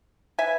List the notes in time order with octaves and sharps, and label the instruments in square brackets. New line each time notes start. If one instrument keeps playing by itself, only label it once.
[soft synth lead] B4 [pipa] E5 G#5